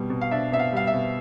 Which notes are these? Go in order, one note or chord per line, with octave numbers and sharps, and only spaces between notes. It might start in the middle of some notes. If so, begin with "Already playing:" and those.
Already playing: B2 G3
B2
F5
D4 E5
B2 E5
F5
G3 F5
E5
B2